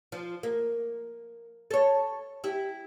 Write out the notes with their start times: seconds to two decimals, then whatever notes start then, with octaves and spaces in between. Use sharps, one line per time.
0.12 F3
0.43 A#3
1.71 A4 C#5
2.44 E4 G4